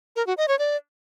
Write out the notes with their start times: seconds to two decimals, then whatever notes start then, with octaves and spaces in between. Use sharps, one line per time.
0.16 A#4
0.27 F#4
0.37 D#5
0.48 C#5
0.59 D5